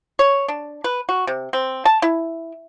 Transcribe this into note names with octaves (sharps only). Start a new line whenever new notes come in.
C#5
D4
B4
F#4
C3
C4
A5
E4